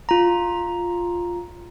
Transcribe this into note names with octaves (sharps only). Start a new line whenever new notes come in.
F4 A#5